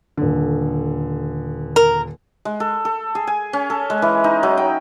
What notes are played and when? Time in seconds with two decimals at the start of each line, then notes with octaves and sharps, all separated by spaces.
0.17 D#1 D3
1.76 A#4
2.45 G#3
2.60 A4
2.85 A4
3.15 G#4
3.27 G#5
3.53 C#4
3.70 A4
3.90 G#3
4.02 E3
4.24 D#4
4.43 F#3
4.57 G5